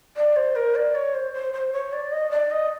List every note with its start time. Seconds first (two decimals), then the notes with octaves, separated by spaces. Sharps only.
0.17 D5
0.36 C5
0.56 A#4
0.75 D5
0.95 C#5
1.14 C5
1.34 C5
1.53 C5
1.73 C#5
1.93 D5
2.12 D#5
2.31 D5
2.51 D#5